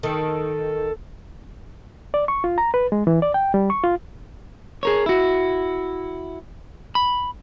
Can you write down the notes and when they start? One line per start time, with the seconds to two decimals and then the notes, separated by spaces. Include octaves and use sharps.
0.03 D#3 A4
2.14 D5
2.28 C#6
2.44 F4
2.58 A#5
2.74 B4
2.92 G#3
3.07 E3
3.22 D5
3.34 G5
3.54 G3
3.70 C#6
3.84 F4
4.83 G#4 A#4 C#5
5.06 E4 F#4
6.95 B5